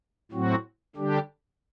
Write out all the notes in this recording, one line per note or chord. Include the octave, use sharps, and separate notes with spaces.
A2 F#3 C4 F#4
D3 G3 D4 G4